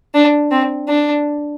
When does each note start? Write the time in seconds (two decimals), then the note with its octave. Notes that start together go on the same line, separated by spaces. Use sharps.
0.14 D4
0.51 C4
0.88 D4